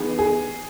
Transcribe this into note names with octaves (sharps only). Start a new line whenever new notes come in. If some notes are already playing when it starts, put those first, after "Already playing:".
Already playing: E3 B3 D#4 G#4
G#4